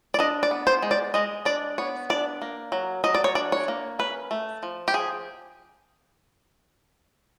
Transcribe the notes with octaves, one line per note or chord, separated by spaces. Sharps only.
D5
D4 D#5
D5
B3
C5
G#3
D5
G#3 D#5
D4 D5
B3 C#5
D4 D5
A#3
F#3
F#3 D#5
D5
C#5
D4 D5
C#5
A#3
C#4 B4
A3
F3
G4
F3 G#4